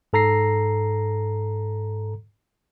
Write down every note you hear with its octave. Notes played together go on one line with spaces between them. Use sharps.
G#2 A4 A#5 A#6 C7